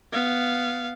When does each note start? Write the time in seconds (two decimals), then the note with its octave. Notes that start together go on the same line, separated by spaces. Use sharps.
0.12 B3 F5